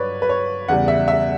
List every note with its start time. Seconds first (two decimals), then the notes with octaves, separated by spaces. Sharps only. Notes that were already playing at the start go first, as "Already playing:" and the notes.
Already playing: G2 F#3 B4 C#5 D5
0.22 B4
0.29 C#5
0.68 E2 C#3 G3 F#5
0.88 E5
1.08 E5